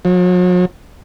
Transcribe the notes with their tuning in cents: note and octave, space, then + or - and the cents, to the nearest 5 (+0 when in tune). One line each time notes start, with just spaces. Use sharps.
F#3 -45